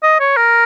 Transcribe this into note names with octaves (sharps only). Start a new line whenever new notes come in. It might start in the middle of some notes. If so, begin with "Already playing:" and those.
D#5
C#5
A#4